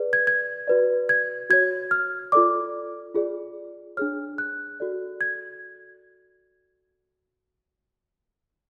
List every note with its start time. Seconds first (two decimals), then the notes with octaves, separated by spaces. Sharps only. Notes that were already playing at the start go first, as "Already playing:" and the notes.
Already playing: G#4 B4 D5
0.13 G#6
0.27 G#6
0.68 F#4 B4 D5
1.09 G#6
1.50 F#4 C#5 G#6
1.91 F6
2.32 F4 A4 D5 D6
3.15 F4 G#4 D5
3.97 D4 G#4 C#5 F6
4.38 F#6
4.80 F#4 A4 D5
5.21 G#6